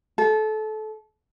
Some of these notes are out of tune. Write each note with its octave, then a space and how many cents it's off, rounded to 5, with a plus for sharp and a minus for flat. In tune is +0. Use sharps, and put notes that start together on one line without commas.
A4 -25